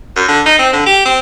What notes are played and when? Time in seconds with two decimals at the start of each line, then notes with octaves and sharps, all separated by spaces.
0.16 F#2
0.28 D3
0.46 D#4
0.59 C4
0.73 D3
0.86 G4
1.06 C4